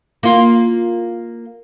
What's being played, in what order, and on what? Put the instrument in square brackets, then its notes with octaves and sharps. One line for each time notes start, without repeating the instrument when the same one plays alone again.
[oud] A#3 F4